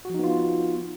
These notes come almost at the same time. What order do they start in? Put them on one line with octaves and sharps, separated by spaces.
F#4 F3 D#4 B3 F4